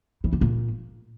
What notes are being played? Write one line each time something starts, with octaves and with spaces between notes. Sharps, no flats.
E3
A2
A#2